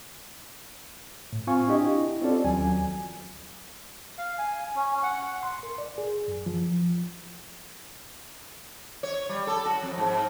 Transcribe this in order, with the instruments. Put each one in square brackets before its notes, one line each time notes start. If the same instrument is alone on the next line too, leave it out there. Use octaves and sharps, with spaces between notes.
[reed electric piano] A2
C4 F4 F5 G#5 C#6
D4 E4 G4 D#5
C4 C#4 F4 A4 D5
D#2 F#3 G#5
[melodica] F5
G#5
C#4
F#5
[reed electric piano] C6
A#4
D5
G#4
F#2
F3
[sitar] C#5
G3
A4
F#4
F2
G#2